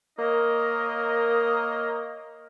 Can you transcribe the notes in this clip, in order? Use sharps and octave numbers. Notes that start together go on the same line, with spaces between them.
A#3 A#4 C#5 D#5